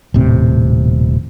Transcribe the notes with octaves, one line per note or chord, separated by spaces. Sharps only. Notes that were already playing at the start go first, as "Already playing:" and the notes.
D#1 A2 C3